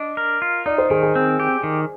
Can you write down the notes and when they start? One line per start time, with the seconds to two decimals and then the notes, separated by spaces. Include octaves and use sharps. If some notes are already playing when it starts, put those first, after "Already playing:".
Already playing: D4 D#5
0.17 A#4
0.42 F4
0.66 D#4 D5
0.78 C5
0.90 D#3 G#4
1.03 G#4
1.15 C4
1.40 G4
1.64 D#3